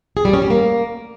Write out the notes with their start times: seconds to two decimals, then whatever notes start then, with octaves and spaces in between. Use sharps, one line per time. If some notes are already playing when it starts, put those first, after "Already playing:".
0.17 G#4
0.25 G3
0.33 C#4
0.42 G3
0.50 A#3